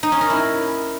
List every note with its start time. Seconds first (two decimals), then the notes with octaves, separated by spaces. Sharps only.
0.03 D#4
0.12 C#4
0.21 A#4
0.30 E4